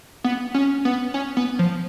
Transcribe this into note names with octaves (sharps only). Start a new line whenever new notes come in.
B3
C#4
B3
C#4
B3
F3